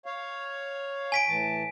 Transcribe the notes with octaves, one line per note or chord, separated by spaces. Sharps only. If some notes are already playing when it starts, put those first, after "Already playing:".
C#5 F5
G#5 B6 D7
A2 E3 A5